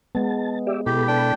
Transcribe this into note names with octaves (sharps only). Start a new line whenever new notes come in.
G#3 B3 A5
G4 D5 E5
B2 E4 G4 A4 B5
D4 G5